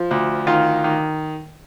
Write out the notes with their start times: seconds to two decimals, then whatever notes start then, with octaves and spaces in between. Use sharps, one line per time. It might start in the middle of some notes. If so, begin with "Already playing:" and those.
Already playing: F3
0.11 D2
0.47 D#3 F4
0.84 D#3